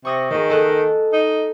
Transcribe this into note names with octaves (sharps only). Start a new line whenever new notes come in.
C3 C#6 D#6 A#6
D#3 A#3 G#4
A4 D#5 F#6
D#4